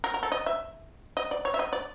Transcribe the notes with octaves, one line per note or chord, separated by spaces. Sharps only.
A#4
A#4
A4
D#5
E5
D#5
D5
C#5
E5
D#5
D5